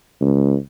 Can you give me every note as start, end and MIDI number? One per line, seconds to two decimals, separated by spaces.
0.21 0.55 37